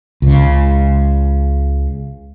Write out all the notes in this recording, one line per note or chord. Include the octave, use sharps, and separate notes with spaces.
C#2 C#3